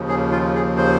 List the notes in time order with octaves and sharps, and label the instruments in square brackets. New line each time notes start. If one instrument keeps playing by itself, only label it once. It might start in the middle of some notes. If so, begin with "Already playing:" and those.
Already playing: [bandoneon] D#2 C#3 F3
G#4
F4
G#4
C5